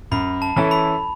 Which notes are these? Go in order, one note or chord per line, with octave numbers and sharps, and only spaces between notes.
F#2 B5
A5
E3 C#4 E4 A4 A5
B5